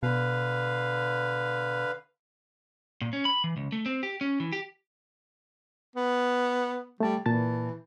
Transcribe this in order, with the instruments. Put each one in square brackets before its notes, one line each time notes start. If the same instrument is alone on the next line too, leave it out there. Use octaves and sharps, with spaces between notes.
[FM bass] B2 [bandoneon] D3 B4 F5
[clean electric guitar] A#2
C#4
B5
E3
C#2
A3
C4
G4
C#4
E3
G4
[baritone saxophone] B3
[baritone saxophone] G3 [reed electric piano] A3 A5
[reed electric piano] A#2 A5 A6 [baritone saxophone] E3